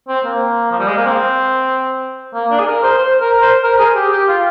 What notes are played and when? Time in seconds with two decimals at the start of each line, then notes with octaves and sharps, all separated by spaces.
0.08 C4
0.25 A#3
0.71 F3
0.79 G3
0.88 G#3
0.97 A#3
1.05 C4
2.34 A#3
2.50 D4
2.59 G#4
2.67 A#4
2.83 C5
2.98 C5
3.20 A#4
3.41 C5
3.63 A#4
3.79 G#4
3.95 G4
4.12 G4
4.28 F4